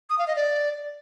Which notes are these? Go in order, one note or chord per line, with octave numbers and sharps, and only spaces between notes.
D#6
F5
D#5
D5